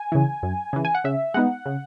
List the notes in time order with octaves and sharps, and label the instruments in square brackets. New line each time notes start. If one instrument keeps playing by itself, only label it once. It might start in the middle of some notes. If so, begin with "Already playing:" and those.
Already playing: [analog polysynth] G#5
C#3 E3
F#2
C#3 E3
G#5
F#5
C#3 E5
G#3 B3 D#4 F#5
C#3